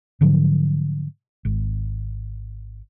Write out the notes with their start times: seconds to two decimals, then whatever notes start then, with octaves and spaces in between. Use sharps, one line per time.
0.21 G#2 D3 F3 F#3
1.45 G#1